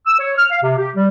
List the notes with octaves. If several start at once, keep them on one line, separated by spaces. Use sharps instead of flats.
E6
C#5
F6
F5
C3
G4
G3